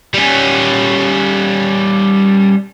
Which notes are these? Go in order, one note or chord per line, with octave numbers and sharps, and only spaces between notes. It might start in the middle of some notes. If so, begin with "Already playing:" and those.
G3 C#4